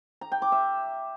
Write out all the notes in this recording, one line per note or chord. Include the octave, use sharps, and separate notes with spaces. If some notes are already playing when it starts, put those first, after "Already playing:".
A#5
G5
D6
E5